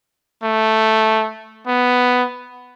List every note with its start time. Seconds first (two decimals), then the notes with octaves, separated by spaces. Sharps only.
0.43 A3
1.67 B3